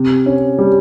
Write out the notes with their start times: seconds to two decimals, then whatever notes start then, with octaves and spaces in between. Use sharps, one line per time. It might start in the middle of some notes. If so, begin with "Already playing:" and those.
Already playing: C3
0.26 C#4
0.59 G3